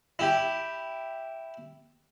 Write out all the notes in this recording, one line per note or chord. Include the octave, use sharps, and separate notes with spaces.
E4 G4